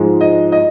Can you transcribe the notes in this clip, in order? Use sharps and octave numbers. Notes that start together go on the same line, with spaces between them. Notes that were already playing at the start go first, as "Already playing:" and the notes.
Already playing: G#2 F3 G#3
D#5
D#5